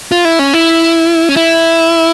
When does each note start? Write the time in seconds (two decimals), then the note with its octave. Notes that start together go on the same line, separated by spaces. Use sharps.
0.12 F4
0.25 E4
0.39 C#4
0.54 E4
1.29 C#4
1.36 E4